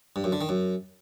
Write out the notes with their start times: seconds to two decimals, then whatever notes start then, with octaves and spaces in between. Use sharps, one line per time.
0.16 G2
0.24 F#2
0.32 D3
0.41 D#3
0.49 F#2